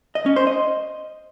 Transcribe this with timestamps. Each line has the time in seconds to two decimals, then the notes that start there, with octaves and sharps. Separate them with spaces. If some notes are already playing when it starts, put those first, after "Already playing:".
0.15 D#5
0.26 C#4
0.36 C5
0.47 D#5